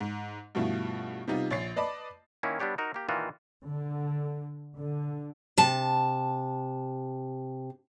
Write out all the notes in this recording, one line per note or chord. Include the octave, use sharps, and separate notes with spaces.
G#2
G2 B2 F3 A3 E4 F4
C3 G3 B3 D#4 F4
A#1 C#5 A6 C7
B4 D5 D#5 A5 B5 D6
D#3 A#3 C#4 E4
G3 B3 D4 G4 C#5
D#4 F#4 A#4
A#3 G4
A#2 D#3 E3 D#4 F4 F#4
D3
D3
C3 A5